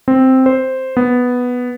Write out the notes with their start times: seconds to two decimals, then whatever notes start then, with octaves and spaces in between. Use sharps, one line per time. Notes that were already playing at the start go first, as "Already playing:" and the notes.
0.08 C4
0.46 C5
0.97 B3